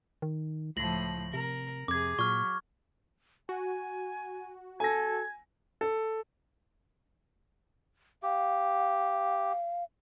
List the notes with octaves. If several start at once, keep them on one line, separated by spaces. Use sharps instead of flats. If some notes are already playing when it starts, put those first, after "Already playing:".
D#3
C#2 A2 F3 A#6 F#7
C3 A#4
F2 C3 G#4 D6 G#6
A#2 F#3 C#6 F6
F#4 G#5
A4 G#5 G#6 A#6
A4
G4 F5